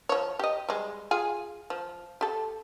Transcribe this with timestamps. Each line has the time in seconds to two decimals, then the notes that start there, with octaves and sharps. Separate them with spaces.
0.09 F3 C#5
0.39 G4 D#5
0.69 G3 G#3
1.11 F4 G#4 G#5
1.70 F3
2.21 G4 A4